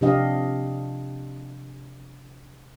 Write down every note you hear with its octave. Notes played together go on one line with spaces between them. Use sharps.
C3 F3 D4 G4 D#5 F5